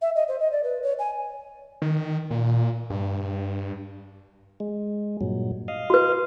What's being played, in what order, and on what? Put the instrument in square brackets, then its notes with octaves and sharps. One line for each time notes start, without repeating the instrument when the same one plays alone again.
[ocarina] E5
D#5
C5
D#5
D5
B4
C#5
G#5
[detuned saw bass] D#3
A#2
G2
[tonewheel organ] G#3
G2 A#2 F#3
D#5 F5
[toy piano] F#4 B4